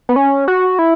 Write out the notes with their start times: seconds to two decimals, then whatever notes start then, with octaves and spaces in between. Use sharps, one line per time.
0.09 B3
0.16 C#4
0.48 F#4
0.79 E4